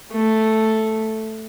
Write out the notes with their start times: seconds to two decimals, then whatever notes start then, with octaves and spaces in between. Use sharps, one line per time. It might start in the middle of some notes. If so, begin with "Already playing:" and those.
0.12 A3